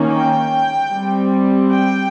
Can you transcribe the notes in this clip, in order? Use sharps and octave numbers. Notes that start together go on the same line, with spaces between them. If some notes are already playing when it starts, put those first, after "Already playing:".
Already playing: D#3 A#3 C#4
G5
G3 C4
G5